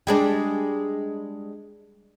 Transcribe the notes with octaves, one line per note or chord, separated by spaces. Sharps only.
G3 G#3 D4